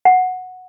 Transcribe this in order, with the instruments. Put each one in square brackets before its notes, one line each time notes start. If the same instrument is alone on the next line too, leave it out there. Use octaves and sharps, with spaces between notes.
[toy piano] F#5